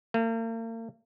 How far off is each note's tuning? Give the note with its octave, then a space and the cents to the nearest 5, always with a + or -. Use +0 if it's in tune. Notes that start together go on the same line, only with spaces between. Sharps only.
A#3 -45